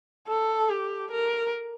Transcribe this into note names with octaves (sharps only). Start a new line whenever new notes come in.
A4
G4
A#4